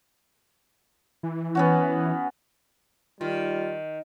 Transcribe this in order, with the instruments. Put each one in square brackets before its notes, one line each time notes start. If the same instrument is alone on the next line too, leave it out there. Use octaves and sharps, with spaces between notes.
[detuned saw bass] E3
[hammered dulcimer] B3 C#4 F#4
[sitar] D#3 [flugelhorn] G3 [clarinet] F4